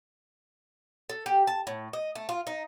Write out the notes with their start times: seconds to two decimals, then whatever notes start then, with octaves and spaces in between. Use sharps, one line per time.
1.09 A4
1.26 G4
1.47 A5
1.67 A2
1.93 D#5
2.15 A3
2.29 F4
2.47 D#4